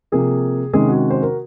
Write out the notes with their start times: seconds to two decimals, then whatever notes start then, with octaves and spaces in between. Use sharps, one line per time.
0.12 C3 F3 A#3 G#4
0.73 C3 D#3 G#3 C#4 G#4
0.88 F#4
1.11 C5
1.22 A#4